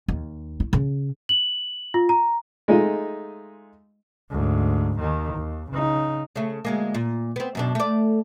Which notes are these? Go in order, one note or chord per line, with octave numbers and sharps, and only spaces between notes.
D#2
E4
C#3
F#7
F4
A#5
G#3 A3 D#4 F4 D#5
D2 G#2
D#2 D#3
D#2
C#3 D#4
C#3 A3
D2 G#3 A#3
A#2
B3 C4
F#2 B2 D4
A3 D5